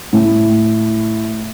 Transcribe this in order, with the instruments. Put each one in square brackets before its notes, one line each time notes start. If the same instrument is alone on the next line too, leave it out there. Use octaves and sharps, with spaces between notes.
[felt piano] A2